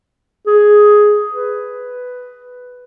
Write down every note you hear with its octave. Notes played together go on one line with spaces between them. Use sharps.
G#4
B4